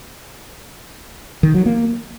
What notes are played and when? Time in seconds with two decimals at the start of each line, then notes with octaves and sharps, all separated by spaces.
1.43 D#3
1.55 F#3
1.66 A#3